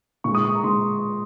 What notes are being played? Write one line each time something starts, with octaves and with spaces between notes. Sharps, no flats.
A#2 G#3 C#6
D#6
C#6
A#5
A#2 G#3 C6